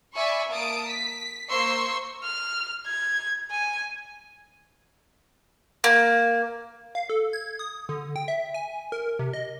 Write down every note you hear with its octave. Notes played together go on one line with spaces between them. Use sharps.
D5 E5 G#5 B5 C#6
A#3 A5 D#6 D7
B6
A#3 C5 C6 C#6 E6 C7
F6
G#6
G#5
A#3
F5
A4
G#6
D#6
D3
G5
E5
G#5
A#4
C3
D#5